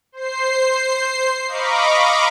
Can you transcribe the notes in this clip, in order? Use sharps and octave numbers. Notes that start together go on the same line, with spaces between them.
C5 C7
D#5 F5 A#5 B5 C#6 D6